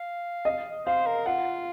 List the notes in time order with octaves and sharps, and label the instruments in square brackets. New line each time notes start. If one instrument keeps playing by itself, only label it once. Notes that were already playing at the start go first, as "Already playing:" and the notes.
Already playing: [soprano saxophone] F5
[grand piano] D#5
[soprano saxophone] C5 [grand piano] F5
[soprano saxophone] A#4
[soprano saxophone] F4 [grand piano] F#5